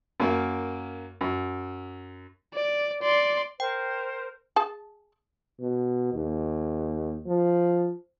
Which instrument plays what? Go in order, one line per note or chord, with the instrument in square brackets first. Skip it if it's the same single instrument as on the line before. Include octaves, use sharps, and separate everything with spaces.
[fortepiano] F#2 A#3
F#2
[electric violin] D5
D5 C6
[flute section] A#4 C5 [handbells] G5
[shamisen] G#4 A5
[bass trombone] B2
D#2
F3